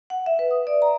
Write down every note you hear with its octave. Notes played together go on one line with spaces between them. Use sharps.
F#5
E5
B4
D#6
D5
A#5